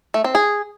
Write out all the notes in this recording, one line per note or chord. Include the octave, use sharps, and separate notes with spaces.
A3
C4
G#4